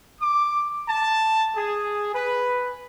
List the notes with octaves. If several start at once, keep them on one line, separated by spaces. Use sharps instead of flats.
D6
A5
G#4
B4